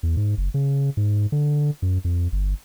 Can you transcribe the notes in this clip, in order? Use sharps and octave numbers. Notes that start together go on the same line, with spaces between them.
E2
G#2
F#1
C#3
G#2
D3
F#2
F2
G1